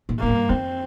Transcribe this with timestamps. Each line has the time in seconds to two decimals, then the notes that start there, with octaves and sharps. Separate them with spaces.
0.09 A#2
0.19 A2 A#3
0.29 G2
0.49 F2 C4